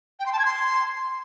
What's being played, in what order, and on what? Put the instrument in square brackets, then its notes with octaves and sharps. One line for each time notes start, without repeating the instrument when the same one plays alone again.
[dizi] G5
C6
A5
G#6
C6